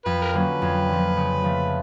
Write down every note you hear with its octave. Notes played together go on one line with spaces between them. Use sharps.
F2 B4
A#4
D3 F#3 A#3 C#4 B4
F2
D3 F3
C#3
F3 A3